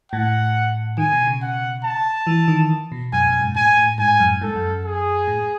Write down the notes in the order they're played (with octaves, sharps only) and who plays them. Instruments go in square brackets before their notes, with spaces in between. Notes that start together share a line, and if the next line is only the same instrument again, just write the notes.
[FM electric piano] A2 [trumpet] F#5
[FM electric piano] D#3 [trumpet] G#5
[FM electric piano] B2
C#3
[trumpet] F#5
A5
[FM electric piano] E3
D#3
B2
[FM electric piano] F#2 [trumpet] G#5
[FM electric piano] F#2
G#2
[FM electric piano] A2 [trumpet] G#5
[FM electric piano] A2
[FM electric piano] G#2 [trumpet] G#5
[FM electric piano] F#2
[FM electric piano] G#2 [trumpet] A4
[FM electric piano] F#2
[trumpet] G#4
[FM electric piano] A2